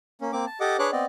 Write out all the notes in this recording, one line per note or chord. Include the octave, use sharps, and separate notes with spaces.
A#3 C#4
A#3 C4 D6
A5
G4 A4 D#5 F#5 D6
D4 G#4 B4 C#5 D6 F#6
B3 C4 D5 D#5